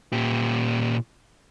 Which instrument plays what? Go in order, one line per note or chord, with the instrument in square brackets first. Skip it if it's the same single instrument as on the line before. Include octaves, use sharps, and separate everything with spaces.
[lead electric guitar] A#2 G4